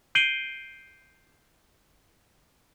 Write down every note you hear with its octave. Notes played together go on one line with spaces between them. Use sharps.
G6 C7 D7 D#7 F#7 G7